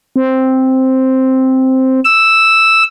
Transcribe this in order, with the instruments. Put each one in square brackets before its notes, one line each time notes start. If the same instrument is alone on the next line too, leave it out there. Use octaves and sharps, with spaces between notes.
[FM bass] C4
[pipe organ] E6